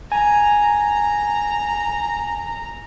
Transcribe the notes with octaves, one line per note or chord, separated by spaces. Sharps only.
G#5 A#5